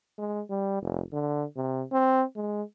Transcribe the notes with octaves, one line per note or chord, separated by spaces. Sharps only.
G#3
G3
F1
D3
C3
C4
G#3